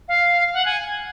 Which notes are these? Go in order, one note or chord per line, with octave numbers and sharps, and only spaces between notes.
F5
F#5
G#5